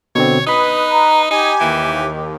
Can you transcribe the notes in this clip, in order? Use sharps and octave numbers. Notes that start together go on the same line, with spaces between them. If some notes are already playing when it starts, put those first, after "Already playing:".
B2 D3 C4 C#5
D#4 B4 B5 D#6
A#5
D#4 G4 G#5
D#2 E3